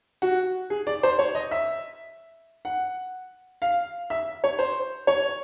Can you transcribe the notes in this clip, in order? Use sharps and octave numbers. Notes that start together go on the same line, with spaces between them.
F#4
G#4
D5
C5
C#5
D#5
E5
F#5
F5
E5
C#5
C5
C#5